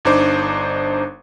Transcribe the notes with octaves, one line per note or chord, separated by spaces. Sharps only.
G1 D4 D#4 C5 D6